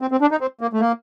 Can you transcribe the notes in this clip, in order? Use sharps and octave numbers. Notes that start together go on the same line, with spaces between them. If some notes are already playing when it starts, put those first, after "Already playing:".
C4
C4
D4
D#4
C4
A#3
A3
A#3